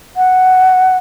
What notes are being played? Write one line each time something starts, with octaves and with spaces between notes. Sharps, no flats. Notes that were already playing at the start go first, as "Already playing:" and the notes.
F#5